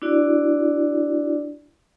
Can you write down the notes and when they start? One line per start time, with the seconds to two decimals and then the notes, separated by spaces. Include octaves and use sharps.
0.02 D4 E4 F#4 D5